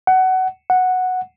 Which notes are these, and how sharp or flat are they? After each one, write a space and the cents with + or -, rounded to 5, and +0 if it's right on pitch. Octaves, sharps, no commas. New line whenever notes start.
F#5 +20
F#5 -5